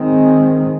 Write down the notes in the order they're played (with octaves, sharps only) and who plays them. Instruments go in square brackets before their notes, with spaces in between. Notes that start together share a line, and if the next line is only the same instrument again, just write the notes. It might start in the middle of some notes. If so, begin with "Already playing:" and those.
Already playing: [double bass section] D#3 G#3 C4